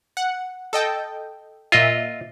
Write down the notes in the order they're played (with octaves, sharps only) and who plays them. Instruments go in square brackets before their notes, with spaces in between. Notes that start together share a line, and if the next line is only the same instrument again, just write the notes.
[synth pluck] F#5
A4 D#5 G5
[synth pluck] A#2 E5 [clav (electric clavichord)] F4 D#5